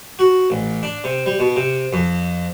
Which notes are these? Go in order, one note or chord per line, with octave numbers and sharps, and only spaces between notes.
F#4
A1
D4
C3
G3
B2
C3
F2